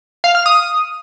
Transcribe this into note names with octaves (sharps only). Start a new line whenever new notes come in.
F5
F6
D#6